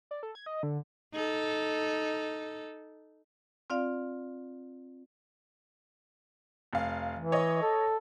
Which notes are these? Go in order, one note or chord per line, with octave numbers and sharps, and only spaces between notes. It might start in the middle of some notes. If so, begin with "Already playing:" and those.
D5
A4
G#6
D#5
D3
D#4 A4
C4 F4 D5 F5
F1 F5
E3
C#5 D#5
A4